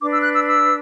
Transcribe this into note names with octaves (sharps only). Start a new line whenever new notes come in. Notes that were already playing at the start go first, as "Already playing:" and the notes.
D4 B4 D6
E6
F#6
E6
E6